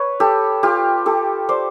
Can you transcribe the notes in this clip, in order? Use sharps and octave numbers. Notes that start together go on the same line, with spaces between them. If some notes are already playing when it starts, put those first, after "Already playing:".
Already playing: B4 C#5
G4 A4
F4 G4
G4 A4
C5 D5